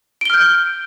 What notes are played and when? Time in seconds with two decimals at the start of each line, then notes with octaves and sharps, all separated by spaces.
0.21 D7
0.25 G7
0.30 F6
0.34 G6